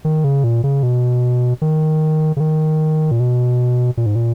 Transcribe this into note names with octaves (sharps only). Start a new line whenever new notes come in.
D#3
C#3
A#2
C#3
B2
D#3
C#3
D#3
A#2
B2
A#2
G#2
A#2